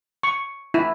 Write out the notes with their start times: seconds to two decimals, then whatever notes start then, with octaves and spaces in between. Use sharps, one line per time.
0.23 C#6
0.74 E4